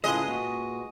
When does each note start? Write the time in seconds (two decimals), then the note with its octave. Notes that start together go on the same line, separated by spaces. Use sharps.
0.04 A2 C#3 G#3 F4 G#4 A4 B4 D#5
0.28 A#2 F#4